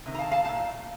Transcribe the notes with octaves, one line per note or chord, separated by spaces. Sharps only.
C3 D#3
A#5
F5 A5
F5 A5
A#2 A3 F5 A5